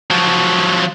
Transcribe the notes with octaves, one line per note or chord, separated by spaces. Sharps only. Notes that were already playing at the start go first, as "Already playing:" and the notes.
F3 F#3